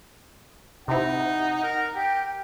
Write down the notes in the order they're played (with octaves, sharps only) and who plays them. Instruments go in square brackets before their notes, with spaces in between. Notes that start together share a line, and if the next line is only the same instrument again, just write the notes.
[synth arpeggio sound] C3 E4 [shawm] D#4 [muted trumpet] F#5
[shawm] A#4
[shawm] G4 [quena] G5